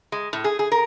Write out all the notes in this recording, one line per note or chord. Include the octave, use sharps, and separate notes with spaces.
G#3
A2
G#4
G#4
A#4